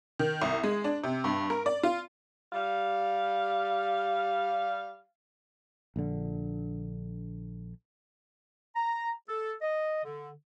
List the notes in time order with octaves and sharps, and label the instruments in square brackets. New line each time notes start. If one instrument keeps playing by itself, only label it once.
[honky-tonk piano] D#3
C2
G#3
D4
C3
G2
A#4
D5
F4
[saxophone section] G3 F5
[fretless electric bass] A#1 D3
[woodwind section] A#5
A4
D#5
D3